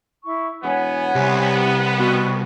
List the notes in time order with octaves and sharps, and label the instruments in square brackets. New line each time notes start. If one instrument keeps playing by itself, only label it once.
[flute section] E4 C#6
[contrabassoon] E1 [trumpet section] B3 [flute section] C#5 F#5 G#5
[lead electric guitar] C2 [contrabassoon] C3
[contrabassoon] B2 [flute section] F#4